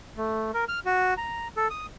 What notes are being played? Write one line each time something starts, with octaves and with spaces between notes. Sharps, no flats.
A3
A#4
F6
F#4
A#5
A4
D#6